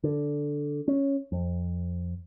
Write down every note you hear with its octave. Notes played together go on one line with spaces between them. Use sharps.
D3
C#4
F2